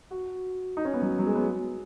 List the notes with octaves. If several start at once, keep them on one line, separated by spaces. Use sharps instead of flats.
F#4
D#4
C#4
B3
F#3
F#3
G#3
B3